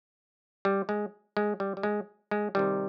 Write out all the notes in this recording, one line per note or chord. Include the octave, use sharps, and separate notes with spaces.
G3
G#3
G#3
G3
G3
G#3
G#3
C3 D#3 G3